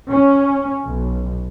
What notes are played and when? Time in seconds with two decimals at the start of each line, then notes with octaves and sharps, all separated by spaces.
0.11 C#4
0.85 B1